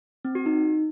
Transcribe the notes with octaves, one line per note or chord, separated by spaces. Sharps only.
C4
F#4
D#4